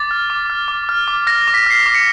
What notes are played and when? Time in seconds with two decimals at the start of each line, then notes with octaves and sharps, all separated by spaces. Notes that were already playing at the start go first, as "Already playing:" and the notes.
Already playing: D6 A6
0.11 F6
0.30 D6
0.50 F6
0.68 D6
0.89 F6
1.08 D6
1.27 F6 A#6
1.47 D6
1.54 B6
1.66 F6 C7
1.79 B6
1.86 D6
1.95 C#7